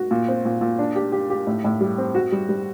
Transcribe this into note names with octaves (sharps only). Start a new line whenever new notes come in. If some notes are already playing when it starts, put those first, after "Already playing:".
Already playing: F#4
A#2
C4
A#2
A#2
D4
G4
G4
G4
A2
A2
G3
C4
F#4
G3
G3